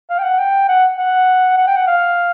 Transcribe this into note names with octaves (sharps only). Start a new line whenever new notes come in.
F5
G5
F#5
G5
F#5
F#5
F#5
G5
F#5
F5